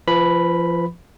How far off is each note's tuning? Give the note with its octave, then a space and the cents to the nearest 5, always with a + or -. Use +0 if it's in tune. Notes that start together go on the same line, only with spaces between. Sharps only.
F3 -30 B4 +0 B5 +0